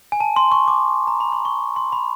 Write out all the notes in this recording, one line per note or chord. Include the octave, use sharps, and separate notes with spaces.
G#5
A5
C6
C#6
D6
A#5
B5
C6
C#6
C6
B5